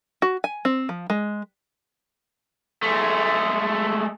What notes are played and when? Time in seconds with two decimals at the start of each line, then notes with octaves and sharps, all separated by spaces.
0.22 F#4
0.44 G#5
0.65 C4
0.89 F3
1.10 G#3
2.82 G#3 A3